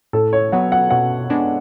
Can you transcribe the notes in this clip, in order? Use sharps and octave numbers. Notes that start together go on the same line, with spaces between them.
A2 A4
C#5
F#3 B3 F#5
F#5
B2 F#5
G#3 B3 D4